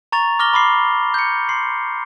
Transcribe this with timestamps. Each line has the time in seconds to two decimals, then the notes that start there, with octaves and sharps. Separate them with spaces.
0.12 A#5 C#6 A6 F7
0.39 D6 F6 A#6 G7
0.53 B5 C6 D6 C7
1.14 G6 C#7
1.49 C6 C7